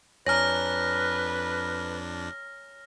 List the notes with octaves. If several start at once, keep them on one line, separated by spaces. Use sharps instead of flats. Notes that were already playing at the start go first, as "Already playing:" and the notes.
F2 D4 B4 C#5 G#5 A#5 F6 A#6